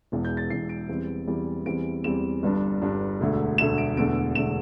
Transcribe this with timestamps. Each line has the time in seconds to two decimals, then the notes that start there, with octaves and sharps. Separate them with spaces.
0.12 E1 E2 E3
0.25 G6
0.37 A6
0.50 E1 E2 E3 C7
0.69 D7
0.89 E2 E3 G3 C4
1.27 E2 E3 G3 C4
1.66 E2 E3 G3 C4 D7
2.04 E2 E3 G3 C4 E7
2.43 G1 G2 G3 D4
2.81 G1 G2 G3 D4
3.20 E1 D2 D3 A3
3.58 E1 D2 D3 A3 E7
3.78 D7
3.97 E1 E2 D3 A3 D7
4.35 E1 E2 D3 A3 E7